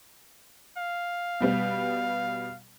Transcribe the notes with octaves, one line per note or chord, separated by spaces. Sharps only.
F5
B2 G3 B3